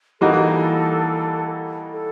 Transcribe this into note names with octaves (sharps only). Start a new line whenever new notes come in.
E3 G3 A#3 D#4 F#4 A4
A4